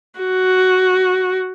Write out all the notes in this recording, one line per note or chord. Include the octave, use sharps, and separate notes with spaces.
F#4